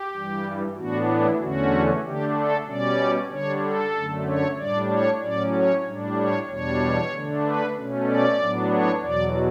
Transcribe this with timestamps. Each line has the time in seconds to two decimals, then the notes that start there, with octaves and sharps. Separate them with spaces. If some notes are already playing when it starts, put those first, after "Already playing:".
Already playing: G4
0.12 G2 E3 G3
0.75 A2 E3 B3 D4 F#4
1.07 E4
1.39 E2 D3 A3 C#4 F#4
2.03 D3 A3 D4 G4
2.35 A4
2.65 B2 G3 C#4 D5
3.29 D3 G3 D4 C#5
3.61 A4
3.93 F#2 D3 A3
4.25 C#5
4.56 A2 G3 D4 D5
4.88 C#5
5.20 A2 F#3 C#4 D5
5.52 C#5
5.84 A2 G3 D4
6.16 C#5
6.47 E2 B2 G3 D4 C#5
7.11 D3 A3 D4
7.43 B4
7.75 B2 A3 C#4
8.06 D5
8.38 A2 F#3 B3 D4
8.69 C#5
9.01 E2 B2 F#3 D5